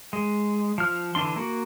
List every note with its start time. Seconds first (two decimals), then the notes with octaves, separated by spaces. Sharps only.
0.13 G#3
0.78 F3 F6
1.15 D3 E3 D4 C6
1.36 A#3 F#4